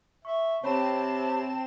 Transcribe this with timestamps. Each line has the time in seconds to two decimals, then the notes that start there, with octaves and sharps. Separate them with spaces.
0.25 E5 C#6
0.64 C3 C4 C#5 A5 B5 E7